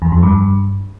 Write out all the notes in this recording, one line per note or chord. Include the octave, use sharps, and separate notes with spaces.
E2
F2
G2